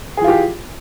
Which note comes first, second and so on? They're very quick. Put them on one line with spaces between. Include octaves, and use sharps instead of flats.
G#4 E3 F4 G4